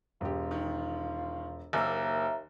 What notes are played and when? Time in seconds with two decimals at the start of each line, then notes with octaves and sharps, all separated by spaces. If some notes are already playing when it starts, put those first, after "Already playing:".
0.21 E1 F4 G4
0.51 D#3
1.73 F#1 D#2 A#3 E5 A#5 E6